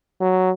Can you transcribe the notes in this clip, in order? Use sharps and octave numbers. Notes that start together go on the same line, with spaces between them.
F#3